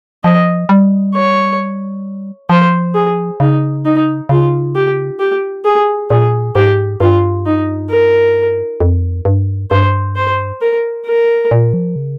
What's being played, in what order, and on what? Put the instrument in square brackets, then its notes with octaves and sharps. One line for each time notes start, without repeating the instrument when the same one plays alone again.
[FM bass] F3 [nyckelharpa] D#5
[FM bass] G3
[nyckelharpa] C#5
[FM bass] F3 [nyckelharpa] C5
[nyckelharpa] G#4
[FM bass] C#3 [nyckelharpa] D#4
[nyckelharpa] D#4
[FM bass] C#3 [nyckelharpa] F4
[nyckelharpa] G4
G4
G#4
[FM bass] A#2 [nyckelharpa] G#4
[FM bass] G#2 [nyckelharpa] G4
[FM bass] G2 [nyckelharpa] F4
[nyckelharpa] D#4
A#4
[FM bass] F2
G2
[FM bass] G2 [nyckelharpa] C5
[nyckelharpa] C5
A#4
A#4
[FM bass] A#2
F3
C#3